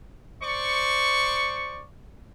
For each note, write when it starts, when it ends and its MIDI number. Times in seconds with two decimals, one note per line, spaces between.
0.42 1.84 72
0.42 1.84 74
0.42 1.84 85